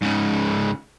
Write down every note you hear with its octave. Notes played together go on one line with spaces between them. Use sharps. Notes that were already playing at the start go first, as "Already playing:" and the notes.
G#2 C#3